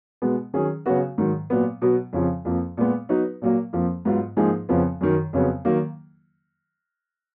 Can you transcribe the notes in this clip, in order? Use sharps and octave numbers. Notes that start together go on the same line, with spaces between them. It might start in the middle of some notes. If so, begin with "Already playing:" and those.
B2 G#3 B3
D#3 F#3 C#4 G#4
C#3 F#3 B3 F#4
G#2 D#3 F#3
A#2 F#3 B3
B2 F#3 B3
F2 C#3 F3
F2 F3 A#3
A#2 G#3 B3
F#3 B3 D#4 F#4 B4
A#2 F#3 A#3
F2 F3 A#3
G#2 F#3 B3 F4
G#2 F3 A#3 D#4 G#4
F2 C#3 F3 B3
F#2 D#3 F#3
F2 C#3 F#3 B3
D#3 F#3 A#3